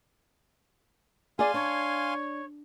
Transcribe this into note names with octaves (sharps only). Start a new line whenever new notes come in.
G#4 D5 F5 G#5 C6
D4 C#5